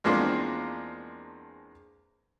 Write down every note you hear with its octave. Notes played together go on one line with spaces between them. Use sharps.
E2 F3 G#3 A#3 C4 D4